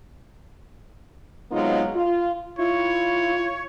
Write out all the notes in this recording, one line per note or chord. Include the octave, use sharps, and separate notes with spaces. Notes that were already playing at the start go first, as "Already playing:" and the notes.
C3 F#3 G#3 B3 D#4 F4
F4
E4 F4 C#5